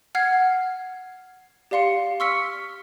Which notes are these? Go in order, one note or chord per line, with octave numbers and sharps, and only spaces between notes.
F#5 F6 G#6 C7
G4 D5 F5 C6 C#7
C6 C#6 E6 F6 B6 C#7